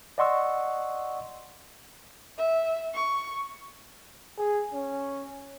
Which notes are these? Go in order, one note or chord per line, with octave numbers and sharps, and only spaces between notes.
D5 D#5 F#5 C6 C#6 E6
E5
C#6
G#4
C#4